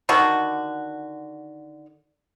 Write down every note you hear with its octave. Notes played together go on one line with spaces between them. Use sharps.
D3 D#3 F#4